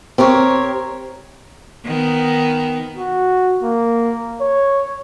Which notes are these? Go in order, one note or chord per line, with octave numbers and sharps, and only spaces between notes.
C4 G4 A#4 C#5
D#3 B3
F#4
A#3
C#5